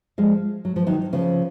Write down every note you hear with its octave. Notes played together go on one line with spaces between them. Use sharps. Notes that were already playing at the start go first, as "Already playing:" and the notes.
F3 G#3
F#3
F3
D#3 F#3
C#3 F3